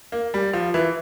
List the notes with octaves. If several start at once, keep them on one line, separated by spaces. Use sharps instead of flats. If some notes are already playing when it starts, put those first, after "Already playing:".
A#3
G3
F3
E3